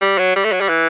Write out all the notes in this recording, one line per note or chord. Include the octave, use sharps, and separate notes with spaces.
G3
F#3
G3
A3
F#3
G3
E3